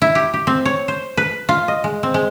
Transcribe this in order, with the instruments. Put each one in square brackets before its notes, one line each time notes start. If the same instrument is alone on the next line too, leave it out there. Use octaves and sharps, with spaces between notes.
[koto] E4
G4
G4
C4
C#5
C5
B4
F4
D#5
G#3
C4
G#3